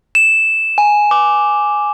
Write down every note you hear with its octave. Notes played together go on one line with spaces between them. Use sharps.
E7
G#5
D6